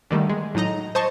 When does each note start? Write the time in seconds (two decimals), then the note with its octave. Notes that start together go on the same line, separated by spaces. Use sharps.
0.11 D3 D#3 G3 A3
0.30 G#3
0.55 A2 F#3 D#4 D#5 A#5
0.95 C5 D#5 A5 C#6